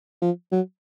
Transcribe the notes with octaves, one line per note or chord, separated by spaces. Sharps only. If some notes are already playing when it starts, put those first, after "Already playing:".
F3
F#3